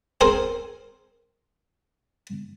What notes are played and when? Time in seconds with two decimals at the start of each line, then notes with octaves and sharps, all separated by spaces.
0.21 C4 G#4 A#4 C5 G#5